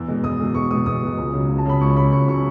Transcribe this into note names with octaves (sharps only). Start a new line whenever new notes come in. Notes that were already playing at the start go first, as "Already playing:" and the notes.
Already playing: E2 E6
B2 G#3
E2 D#6
B2 G#3
E2 C#6
B2 G#3 D#6
E2 D#6
B2 G#3
C#2
C#3 F#3
C#2
A5
C#3 F#3 B5
C#2 C#6
C#3 F#3 B5
C#2 C#6
C#3 F#3 C#6